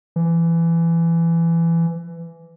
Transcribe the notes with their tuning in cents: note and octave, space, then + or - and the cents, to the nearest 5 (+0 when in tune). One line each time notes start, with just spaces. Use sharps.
E3 +20